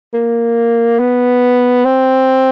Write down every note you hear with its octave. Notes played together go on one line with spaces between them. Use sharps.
A#3
B3
C4